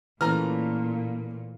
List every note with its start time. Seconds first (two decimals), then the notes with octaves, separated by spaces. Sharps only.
0.21 A#2 E3 A3 C#4 A#5 F6